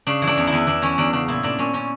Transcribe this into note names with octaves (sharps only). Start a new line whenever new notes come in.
C#3 D4
E3
D4
E2
E4
E2
E2 D4
E3 C#4
E2 D4
C#3 D4
A#2 E4
A#2 D4
A#2 C#4
A#2 C#4